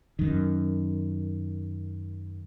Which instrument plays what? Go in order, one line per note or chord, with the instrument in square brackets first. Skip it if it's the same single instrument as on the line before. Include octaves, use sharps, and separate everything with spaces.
[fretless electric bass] F#2 D#3